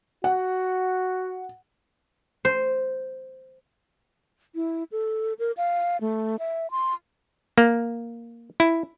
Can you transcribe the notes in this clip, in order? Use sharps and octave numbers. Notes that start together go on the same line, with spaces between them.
F#4 F#5
C5
E4
A4
A#4
F5
A3
E5
C6
A#3
E4